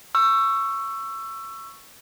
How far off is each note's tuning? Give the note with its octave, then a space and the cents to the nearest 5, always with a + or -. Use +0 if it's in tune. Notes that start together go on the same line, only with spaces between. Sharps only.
C#6 +0 E6 +20